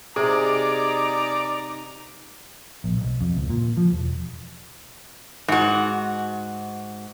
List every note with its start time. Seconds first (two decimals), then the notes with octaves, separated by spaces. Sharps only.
0.16 C3 D#4 G#4 D5 A#5
2.84 A#1
2.97 B1
3.21 F2
3.37 C#2
3.50 A#2
3.77 F3
3.92 E1
5.48 G#2 F#4